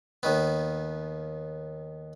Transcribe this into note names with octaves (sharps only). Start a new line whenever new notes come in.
D#2 D#3 B3